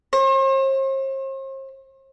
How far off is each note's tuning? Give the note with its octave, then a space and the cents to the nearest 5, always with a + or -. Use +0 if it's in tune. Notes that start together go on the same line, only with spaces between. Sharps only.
C5 +45